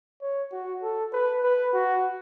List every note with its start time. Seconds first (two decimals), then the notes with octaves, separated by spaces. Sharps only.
0.21 C#5
0.52 F#4
0.83 A4
1.13 B4
1.43 B4
1.74 F#4